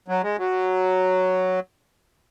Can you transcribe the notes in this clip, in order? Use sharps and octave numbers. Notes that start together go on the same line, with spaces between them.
F#3
G#3
F#3